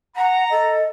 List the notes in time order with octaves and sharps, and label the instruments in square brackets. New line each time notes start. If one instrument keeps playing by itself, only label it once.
[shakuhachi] F#5 [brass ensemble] A#5
[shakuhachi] A4 [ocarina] D#5